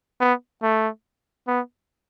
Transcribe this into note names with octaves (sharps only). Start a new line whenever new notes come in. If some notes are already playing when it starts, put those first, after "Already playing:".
B3
A3
B3